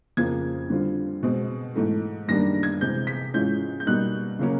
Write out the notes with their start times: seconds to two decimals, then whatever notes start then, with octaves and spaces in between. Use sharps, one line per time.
0.17 F2 C#3 F3 A#3 G#6
0.70 D3 G3 C4 F4
1.23 B2 G#3 C4
1.76 G#2 E3 A3
2.28 F#2 D#3 G3 A#3 D4 A#6
2.63 G#6
2.81 C3 E3 G#3 C4 G6
3.07 B6
3.34 G#2 E3 G#3 C#4 F4 G6
3.80 G6
3.86 B2 G3 A#3 D#4 F#6
4.39 C#3 F#3 A#3 C#4